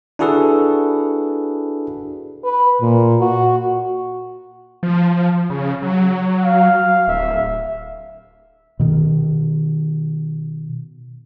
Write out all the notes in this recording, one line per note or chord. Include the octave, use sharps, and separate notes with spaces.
D4 E4 F#4 G#4 A4 B4
B4
A#2
F#4
F3
C#3
F#3
F5
D1 E5
B2 D#3